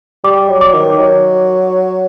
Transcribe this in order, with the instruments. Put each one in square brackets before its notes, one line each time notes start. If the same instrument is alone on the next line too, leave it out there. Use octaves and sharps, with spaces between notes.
[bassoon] G3 [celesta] D6
[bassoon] F#3
[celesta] D6
[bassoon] D#3
F#3